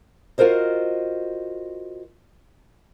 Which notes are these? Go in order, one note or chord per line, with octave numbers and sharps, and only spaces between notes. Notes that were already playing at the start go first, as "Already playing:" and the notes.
F4 F#4 A#4 C5 D#5